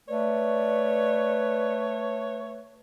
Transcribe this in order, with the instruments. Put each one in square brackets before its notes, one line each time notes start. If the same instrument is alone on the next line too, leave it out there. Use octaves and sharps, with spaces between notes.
[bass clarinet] A3 [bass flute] B4 [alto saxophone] C#5 [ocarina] D5